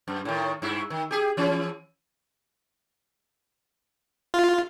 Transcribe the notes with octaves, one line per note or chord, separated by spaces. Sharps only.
F#2
A2 D#3
G2 E4
D#3
G4 G#4
E3 C#4
F4